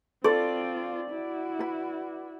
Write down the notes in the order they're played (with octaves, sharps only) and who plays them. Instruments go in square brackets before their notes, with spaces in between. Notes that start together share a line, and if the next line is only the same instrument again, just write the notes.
[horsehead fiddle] C4 F4 [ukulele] A4 [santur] D5
[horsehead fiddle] E4 F#4
[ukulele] B4 B5